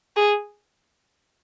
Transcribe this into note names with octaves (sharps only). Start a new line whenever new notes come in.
G#4